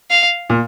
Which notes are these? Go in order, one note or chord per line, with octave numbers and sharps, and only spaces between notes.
F5
A#2